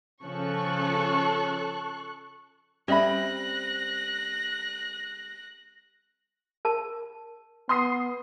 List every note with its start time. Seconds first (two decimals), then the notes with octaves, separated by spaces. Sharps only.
0.25 C#3 F3 C#4 A4 C#6 F#6
2.88 G3 C4 C#4 D#5 E5 B5 F#6 A#6
6.65 A#4 A5
7.69 B3 C6 D#6 C7